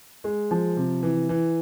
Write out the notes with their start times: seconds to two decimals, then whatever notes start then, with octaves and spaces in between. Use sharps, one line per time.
0.24 G#3
0.51 F3
0.77 C3
1.03 E3
1.29 E3